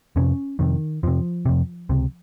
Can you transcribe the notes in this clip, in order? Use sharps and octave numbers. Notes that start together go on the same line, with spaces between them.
F2 C3 C#4
F2 C3 D#3
F2 C3 F3
F2 C3
C#2 C3